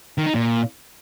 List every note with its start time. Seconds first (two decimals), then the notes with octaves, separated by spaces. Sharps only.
0.18 D#3
0.26 D#4
0.35 A#2